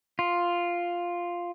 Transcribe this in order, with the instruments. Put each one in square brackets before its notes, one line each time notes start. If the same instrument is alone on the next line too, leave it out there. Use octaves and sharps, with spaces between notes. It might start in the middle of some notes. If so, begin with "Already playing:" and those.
[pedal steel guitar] F4